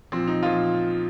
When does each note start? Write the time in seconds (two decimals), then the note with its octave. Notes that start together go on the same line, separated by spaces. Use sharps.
0.12 A#2 F3 C4
0.27 D#4
0.42 A#2 F3 F4